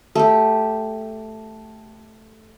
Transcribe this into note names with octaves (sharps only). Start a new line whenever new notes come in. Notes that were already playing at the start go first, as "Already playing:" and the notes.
A3 G4